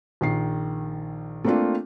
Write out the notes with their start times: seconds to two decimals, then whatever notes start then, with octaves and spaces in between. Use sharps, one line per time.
0.21 A#1 D#3 C7
1.44 A3 A#3 C4 D4 F4